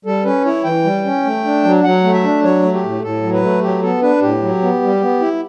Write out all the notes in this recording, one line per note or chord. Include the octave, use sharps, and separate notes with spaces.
G3 A4
C#4 B4
E4 C#5
E3 G5
G3
C#4
A3
D4
F#3
F#3 F#5
A3
E5
D4
F#3 C#5
A3
G4
A2
A2 A4
F#3
B4
A3
F#3 G4
B3 A4
D4 B4
A2 G4
F#3
B3
G3
B3
E4